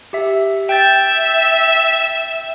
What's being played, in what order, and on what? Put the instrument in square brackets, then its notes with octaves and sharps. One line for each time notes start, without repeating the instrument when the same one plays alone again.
[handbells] G4 E5
[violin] E5 [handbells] G5 G6 A6